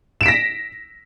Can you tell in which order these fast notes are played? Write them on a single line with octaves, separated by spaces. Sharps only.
E7 D7 B6 A#6